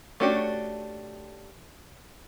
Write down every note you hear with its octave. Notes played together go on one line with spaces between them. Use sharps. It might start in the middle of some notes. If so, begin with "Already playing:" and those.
A3 C#4 D4 F#4 G4